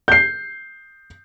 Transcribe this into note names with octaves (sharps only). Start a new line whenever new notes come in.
G6 C7